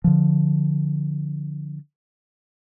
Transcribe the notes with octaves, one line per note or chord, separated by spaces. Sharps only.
D3 F3